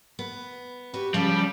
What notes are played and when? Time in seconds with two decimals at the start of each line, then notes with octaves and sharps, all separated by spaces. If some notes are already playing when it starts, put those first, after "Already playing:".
0.19 B3
0.94 F#4 G4 B4
1.14 C#3 F3 G3